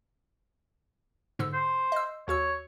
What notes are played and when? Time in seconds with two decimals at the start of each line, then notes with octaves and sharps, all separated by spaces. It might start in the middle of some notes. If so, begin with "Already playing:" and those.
1.39 G#2 D3 E6
1.54 C5
1.92 D#5 E6
2.28 D#2 F#4 C#5 E6